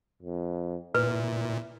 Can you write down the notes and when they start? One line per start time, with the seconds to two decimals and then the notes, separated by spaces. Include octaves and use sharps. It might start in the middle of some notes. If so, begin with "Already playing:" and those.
0.22 F2
0.94 A#2 E4 B4